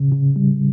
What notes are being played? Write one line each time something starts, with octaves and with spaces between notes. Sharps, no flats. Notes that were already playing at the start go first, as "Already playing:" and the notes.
Already playing: C#3
C#3
G3